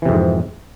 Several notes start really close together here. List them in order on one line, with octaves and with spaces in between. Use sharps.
E3 C3 F2 G#2